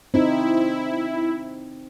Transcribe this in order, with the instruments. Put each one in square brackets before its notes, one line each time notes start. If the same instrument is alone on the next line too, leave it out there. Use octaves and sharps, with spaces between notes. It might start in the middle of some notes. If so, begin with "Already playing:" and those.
[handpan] C4 D#4 [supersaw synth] E4